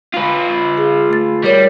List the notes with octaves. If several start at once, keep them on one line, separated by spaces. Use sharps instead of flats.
F4 B4
G#4
A3 A6
G3 F4 A#4 C#5